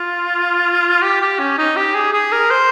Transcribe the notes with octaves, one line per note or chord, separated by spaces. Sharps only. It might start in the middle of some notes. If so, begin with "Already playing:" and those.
Already playing: F4
G4
G4
C#4
D#4
G4
G#4
G#4
A#4
C5